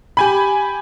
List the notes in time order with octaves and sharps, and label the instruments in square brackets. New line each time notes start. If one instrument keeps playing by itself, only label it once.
[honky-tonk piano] G4 G#5 B5